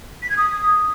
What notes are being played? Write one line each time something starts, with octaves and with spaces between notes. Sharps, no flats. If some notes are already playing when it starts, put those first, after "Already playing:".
B6
G#6
D#6